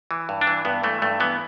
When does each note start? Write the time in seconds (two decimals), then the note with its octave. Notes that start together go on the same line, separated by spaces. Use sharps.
0.11 E3
0.29 G2
0.41 D4
0.47 E3
0.65 G2 B3
0.84 E3 A3
1.02 G2 A3
1.20 E3 B3